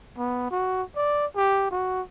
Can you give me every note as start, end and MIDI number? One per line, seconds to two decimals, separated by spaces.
0.18 0.51 59
0.51 0.82 66
0.96 1.26 74
1.36 1.67 67
1.71 2.02 66